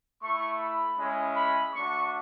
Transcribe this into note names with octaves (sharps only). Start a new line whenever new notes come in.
A3 E4 C#6
B5
G#3 C#4 E4
B5
A3 D4 F#4 C#6